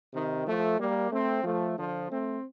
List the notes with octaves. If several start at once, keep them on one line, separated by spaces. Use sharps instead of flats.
C3 D#3
F3 A3
G3 A#3
A3 C4
F3 A3
D3 F3
A3 C4